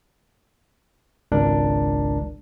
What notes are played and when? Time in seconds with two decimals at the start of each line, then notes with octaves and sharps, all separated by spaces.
1.32 G#1 C#2 D4 A#4